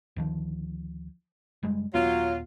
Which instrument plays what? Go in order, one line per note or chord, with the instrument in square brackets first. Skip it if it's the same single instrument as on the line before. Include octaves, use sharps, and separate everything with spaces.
[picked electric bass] D2 D#3 F3
F#1 G3 G#3
[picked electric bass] D#1 B3 [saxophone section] F#3 F4